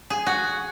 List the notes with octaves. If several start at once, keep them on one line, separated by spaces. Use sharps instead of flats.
G#4
F#4